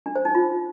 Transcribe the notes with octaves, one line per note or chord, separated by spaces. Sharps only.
D4
C5
D#4
F4